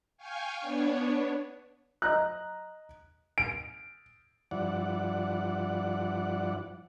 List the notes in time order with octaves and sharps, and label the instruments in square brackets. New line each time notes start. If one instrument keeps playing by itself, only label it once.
[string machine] F5 G5 G#5 C#6
B3 D4 C#5
[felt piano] D#5 A#5 F#6
[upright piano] D7
[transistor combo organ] G2 F3 E4 D5 F#5